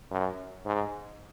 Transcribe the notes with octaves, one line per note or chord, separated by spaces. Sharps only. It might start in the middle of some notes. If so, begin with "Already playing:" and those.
F#2
G#2